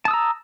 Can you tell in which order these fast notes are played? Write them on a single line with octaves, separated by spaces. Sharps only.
A5 D#6 E6 A#5